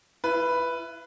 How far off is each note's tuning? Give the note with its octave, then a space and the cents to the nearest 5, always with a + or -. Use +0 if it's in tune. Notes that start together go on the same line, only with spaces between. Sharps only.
F4 -45 B4 +0 E5 +0